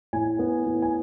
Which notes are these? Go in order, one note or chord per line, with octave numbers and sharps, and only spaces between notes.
A2 G#5
B3
A2
G#5